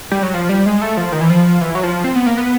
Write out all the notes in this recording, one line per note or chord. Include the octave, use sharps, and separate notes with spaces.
G3
F#3
F3
G3
G#3
A3
F3
D#3
E3
F3
E3
F#3
F3
C4
B3
A#3
B3